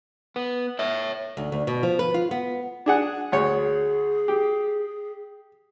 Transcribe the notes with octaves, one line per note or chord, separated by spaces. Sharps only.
B3
C#5 E5
D2
D2
B2
F3
B4
F4
B3
D4 G#4 F#5
D2 G#4 C#5
G4